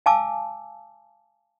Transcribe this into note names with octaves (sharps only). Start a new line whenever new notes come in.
F5 G#5 A5 D6 E6